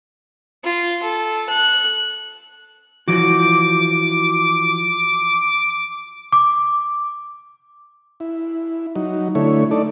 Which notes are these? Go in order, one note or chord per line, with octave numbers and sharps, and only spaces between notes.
F4
A4
F#6
E3 F3 F#4 D6
D6
E4
F#3 D#4
D3 A3 E4 C#5
D#4 A4 D5